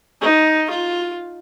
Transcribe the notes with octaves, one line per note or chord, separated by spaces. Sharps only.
D#4
F4